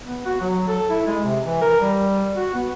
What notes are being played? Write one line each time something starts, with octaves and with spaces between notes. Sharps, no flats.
B3
F#4
F#3
A4
E4
G#3
C3
E3
A#4
G3
F#4
B3